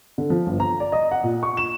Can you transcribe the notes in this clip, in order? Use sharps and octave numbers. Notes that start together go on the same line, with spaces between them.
D3
F3
G1
A#5
D5
D#5
F#5
A#2
C#6
E7